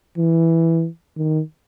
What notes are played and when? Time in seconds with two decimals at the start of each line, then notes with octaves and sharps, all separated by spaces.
0.17 E3
1.17 D#3